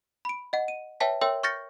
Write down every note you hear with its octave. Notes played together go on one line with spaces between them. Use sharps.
B5 D7
D#5 F#5
D#7
B4 C#5 E5 G5 A5 B6
A#4 C#5 E5 G5 C6 E6
C#6 F6 G6 A6 A#6 C#7